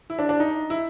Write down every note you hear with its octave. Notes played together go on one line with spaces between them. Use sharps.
E4
D4
D4
D#4
E4